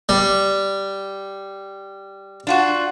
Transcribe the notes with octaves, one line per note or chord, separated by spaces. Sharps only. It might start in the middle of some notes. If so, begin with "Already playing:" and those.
G3
D4 F4 F#4